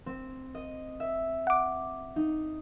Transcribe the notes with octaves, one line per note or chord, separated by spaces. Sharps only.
C4
D#5
E5
F#5 D6
D#4